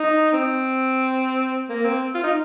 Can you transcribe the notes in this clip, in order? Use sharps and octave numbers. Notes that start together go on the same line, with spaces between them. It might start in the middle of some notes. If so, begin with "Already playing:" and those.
Already playing: D#4
C4
A#3
C4
F4
D#4